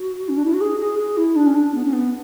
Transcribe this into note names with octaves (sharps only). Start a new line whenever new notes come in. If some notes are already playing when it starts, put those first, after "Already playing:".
Already playing: F#4
C#4
D4
E4
F#4
G#4
G#4
G#4
E4
D4
C#4
D4
B3
C#4
B3